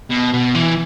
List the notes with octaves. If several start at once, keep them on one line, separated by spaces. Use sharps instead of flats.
B2
B2
E3